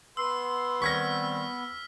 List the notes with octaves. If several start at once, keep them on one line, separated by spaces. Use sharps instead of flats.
B3 C6 E6
D#3 G3 C4 C#6 F6 G#6 A#6 B6